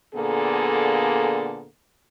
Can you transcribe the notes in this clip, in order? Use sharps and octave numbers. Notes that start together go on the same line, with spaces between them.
A#2 D3 A#3 B3 G#4 A4